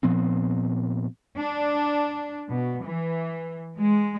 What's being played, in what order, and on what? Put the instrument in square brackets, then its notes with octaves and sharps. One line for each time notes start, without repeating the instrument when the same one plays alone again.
[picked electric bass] A#2 F3 B3 C4
[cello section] D4
B2
E3
G#3